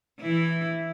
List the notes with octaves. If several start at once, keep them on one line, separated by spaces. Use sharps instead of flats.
E3 E4